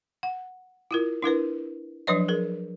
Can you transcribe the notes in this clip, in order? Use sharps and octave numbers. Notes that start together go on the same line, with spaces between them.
F#5
E4 F4 A#4
D4 E4 A#4 B4
F3 F#3 D4 B4 C#5 D#5
G#4 A#4